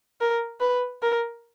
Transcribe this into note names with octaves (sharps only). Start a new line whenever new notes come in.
A#4
B4
A#4